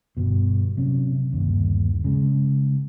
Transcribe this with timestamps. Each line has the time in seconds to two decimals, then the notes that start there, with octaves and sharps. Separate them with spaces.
0.17 G1 B2
0.77 C3 F#3 C#4
1.33 G1 D#2
2.04 C#3 G#3